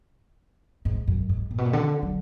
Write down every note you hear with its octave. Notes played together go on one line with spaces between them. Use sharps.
G#2
F#2
G#2
A#2
B2
A#2
D3
F#3